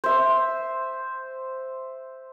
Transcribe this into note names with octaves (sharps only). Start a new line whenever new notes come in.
C5 E5